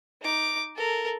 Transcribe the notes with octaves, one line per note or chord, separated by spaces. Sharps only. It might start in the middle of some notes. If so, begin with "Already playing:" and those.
D#4 D6
A4 A#4